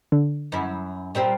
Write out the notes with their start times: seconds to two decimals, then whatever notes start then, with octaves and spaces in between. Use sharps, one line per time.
0.12 D3
0.52 F#2 E4
1.15 A#2 G3 C4